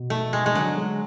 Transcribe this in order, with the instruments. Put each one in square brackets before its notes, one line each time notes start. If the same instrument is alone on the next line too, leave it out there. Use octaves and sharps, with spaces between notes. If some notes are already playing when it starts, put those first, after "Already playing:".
Already playing: [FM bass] B2
[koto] A3
G#3
G#3
[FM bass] D3 [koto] F#3
[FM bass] G#3